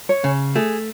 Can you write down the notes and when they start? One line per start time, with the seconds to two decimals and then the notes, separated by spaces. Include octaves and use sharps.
0.09 C#5
0.24 C#3
0.56 A3 G#4